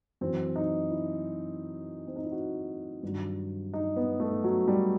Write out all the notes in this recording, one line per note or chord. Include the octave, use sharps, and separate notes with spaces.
F#2 E3 C4
D#4
E4
C4
D#4
E4
F#4
G2 D#3 F#3
D#4
B3
A3
F#3
G3